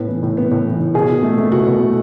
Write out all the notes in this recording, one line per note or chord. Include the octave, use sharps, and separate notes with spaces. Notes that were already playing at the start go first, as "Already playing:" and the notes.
Already playing: A2 B3
E3
A2
B3
A2
E3
A2
B2 G#4
B2
A3
A3
B2 F#4
B2
A3